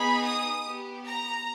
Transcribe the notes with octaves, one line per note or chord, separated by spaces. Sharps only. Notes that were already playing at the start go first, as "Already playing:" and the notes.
Already playing: B3 D#4 G#4 B5
D#6
B3 G4
A#5